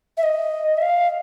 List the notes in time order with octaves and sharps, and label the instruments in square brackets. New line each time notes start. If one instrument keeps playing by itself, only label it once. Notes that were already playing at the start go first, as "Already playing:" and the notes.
[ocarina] E5
D#5
E5
F5